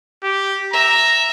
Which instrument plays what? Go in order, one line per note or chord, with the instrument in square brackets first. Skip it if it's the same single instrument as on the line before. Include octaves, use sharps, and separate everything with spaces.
[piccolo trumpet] G4
[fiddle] E5 [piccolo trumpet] A#5